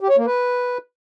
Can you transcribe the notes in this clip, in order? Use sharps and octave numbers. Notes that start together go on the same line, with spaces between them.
G4
C#5
A#3
B4